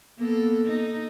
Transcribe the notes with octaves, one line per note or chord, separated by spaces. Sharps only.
A#3 B3 A4
D#4